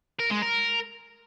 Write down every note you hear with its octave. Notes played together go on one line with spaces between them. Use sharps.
A#4
G#3
A#4